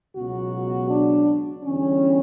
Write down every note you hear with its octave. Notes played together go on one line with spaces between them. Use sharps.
C#2 B2 F#3 F#4
D4
E2 D3 G3 C#4